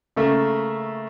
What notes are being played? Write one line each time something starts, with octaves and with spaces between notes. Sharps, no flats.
C#3 A3 A#3 A4 E5